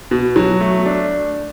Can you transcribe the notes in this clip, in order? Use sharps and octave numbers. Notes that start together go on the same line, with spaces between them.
B2
F#3
A3
D4